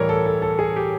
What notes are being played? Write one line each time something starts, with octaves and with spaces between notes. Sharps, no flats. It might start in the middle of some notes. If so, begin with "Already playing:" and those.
Already playing: A2 E3 G3 A#4 C#5 D5
A4
A4
A4
G#4
G4